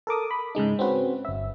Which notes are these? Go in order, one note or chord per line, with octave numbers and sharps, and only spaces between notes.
A4 A#4 D6 D#6
B5
G#2 C#3 G#3 D#4
C4 C#4 F#4 B4
G1 E5